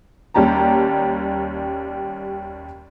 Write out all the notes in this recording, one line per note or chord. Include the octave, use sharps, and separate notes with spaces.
D#2 G3 C#4 G4 A5 A#5